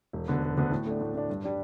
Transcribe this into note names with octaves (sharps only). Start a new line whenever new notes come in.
E1
D2 D3 B3
E1
D2 D3 B3
A2
A3 D4
A2
A3 D4
G2
G3 D4